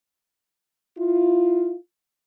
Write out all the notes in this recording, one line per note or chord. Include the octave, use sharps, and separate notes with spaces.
E4 F4